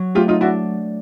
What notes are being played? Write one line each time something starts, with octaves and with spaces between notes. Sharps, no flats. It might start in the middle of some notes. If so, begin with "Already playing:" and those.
Already playing: F#3
A3 F4 G4
D#4 F4
D4 E4 F#4